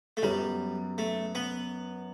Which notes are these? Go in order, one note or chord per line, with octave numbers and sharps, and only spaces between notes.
A3
F#2 F#3 G3 B3
A3
B3